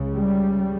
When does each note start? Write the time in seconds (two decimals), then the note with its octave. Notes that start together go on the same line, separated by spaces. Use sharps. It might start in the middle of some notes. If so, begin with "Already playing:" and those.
Already playing: C#2 C#3
0.14 G3